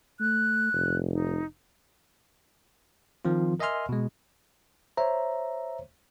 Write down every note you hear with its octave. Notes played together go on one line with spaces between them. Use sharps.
A3 F#6
F1
D#4
D#3 F3 C4 F4
A#4 D#5 E5 G#5 C6 F6
B2 G#3
C5 C#5 E5 A#5